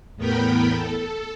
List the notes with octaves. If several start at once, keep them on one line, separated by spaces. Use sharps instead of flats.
E2 A2 B3 A#4 G5 B5
A4